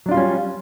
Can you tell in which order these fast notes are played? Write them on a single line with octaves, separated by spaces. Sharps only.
F#3 D4 F4 G3 C#4